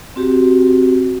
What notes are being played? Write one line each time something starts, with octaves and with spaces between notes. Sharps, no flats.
C4 F#4 G4